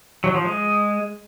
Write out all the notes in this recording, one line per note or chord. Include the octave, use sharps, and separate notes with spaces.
F#3
F3
G#3